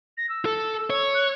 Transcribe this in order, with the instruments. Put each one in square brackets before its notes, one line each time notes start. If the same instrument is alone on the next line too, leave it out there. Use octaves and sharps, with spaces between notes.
[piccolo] A#6
E6
[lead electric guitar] A4
C#5
[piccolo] F#6